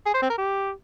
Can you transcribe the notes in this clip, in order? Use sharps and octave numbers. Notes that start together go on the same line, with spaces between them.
G#4
C5
C4
A#4
G4